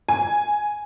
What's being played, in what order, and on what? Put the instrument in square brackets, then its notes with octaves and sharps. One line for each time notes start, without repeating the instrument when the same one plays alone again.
[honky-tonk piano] G#5